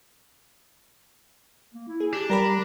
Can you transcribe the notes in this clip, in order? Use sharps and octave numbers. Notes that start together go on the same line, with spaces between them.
A#3
E4
G#4
D4 G4
G3 G4 A#4 A#5 B5